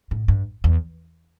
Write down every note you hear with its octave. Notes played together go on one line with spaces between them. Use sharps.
A2
G2
E2